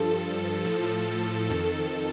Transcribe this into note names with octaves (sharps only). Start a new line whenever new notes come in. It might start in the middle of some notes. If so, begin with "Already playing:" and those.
Already playing: G2 F3 A4
A2 F3
F2 D#3